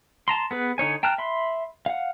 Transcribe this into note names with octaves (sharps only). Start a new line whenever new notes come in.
A5 A#5 C6
B3 G#4 B4
D3 D#4 C#5 G#5
G5 A5 A#5 F6 F#6
E5 B5 C6
F5 F#5